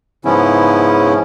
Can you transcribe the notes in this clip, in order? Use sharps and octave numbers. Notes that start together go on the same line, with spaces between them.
G#2 C#3 F3 B3 C#4 E4